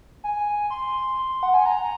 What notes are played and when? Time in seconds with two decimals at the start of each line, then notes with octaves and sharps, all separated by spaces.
0.24 G#5
0.70 C6
1.18 C6
1.43 F#5
1.54 G#5
1.66 A#5